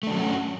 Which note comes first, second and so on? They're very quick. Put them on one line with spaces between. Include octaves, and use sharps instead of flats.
A3 D4 F#3 C#4 F#4